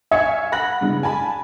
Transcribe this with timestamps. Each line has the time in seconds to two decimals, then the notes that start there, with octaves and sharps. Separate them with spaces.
0.11 E5 F5 G#5 C#6 G#6 C#7
0.52 F#5 B5 F#6 A#6 F#7
0.81 G2 C#3 E3 G#3
1.03 G#5 A5 B5